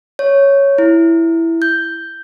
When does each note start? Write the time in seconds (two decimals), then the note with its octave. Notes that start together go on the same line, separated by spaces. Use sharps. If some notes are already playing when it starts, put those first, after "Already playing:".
0.19 C#5
0.78 E4
1.62 G6